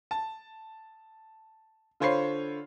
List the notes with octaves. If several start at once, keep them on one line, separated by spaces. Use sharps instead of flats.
A5
D3 F4 C5 C#5 B5 C7